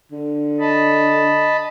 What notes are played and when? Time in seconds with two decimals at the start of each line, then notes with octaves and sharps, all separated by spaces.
0.12 D3
0.60 D#5 A5 B5